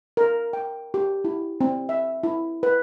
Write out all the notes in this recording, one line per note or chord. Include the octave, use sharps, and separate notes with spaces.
A#4
G5
G4
E4
C4
E5
E4
B4